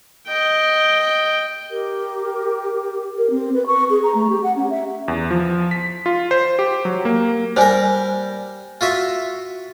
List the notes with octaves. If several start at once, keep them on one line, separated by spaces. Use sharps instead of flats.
D#5 G5
G4 A#4
A#4
C4
B4
C#6
G#4
A#5
A3
G4
F#5
C#4
E5
E2
F3
B6
F4
C5
G4
F#3
A#3
G3 A#4 C5 G#5
F4 F#4 E5